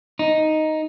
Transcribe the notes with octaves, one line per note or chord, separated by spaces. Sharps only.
D#4